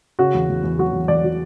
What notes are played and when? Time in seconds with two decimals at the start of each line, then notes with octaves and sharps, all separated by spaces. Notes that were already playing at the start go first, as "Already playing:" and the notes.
0.19 C#3 F#4
0.35 E2
0.49 E2
0.64 E2
0.79 F#3 F#4
0.93 E2
1.08 E2 D5
1.24 F#3